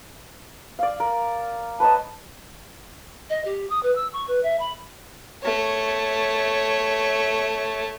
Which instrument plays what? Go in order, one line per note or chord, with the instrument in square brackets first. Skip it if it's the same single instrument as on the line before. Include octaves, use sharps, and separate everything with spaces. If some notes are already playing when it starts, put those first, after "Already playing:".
[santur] D5 F5
A#4
[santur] B4 C#5 D#5 [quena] A5
[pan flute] D#5
G4
D#6
B4
E6
C#6
B4
E5
B5
[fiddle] A3 C#5